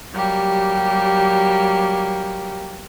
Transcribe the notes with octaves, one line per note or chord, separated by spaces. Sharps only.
F#3 G3 A#3 G4